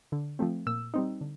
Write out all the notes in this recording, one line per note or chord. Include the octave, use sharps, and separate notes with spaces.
D3
F3 A3 C4
A#2 E6
G3 C4 D#4
D3